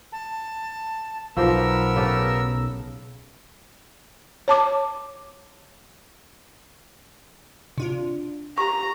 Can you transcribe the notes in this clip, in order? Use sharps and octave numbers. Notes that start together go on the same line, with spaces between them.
A5
B1 F3 B3 G4 A#4 C5 E6
C#3 G4 A4
C#5 A5 D6
C3 D4 F4
G4 A#5 C#6